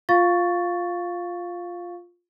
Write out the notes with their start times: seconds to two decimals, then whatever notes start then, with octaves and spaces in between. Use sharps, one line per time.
0.09 F4 F5 C#6 A6